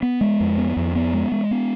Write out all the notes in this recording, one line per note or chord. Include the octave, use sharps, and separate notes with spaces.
B3
G#3
F2
B3
F2
B3
G#3
G#3
B3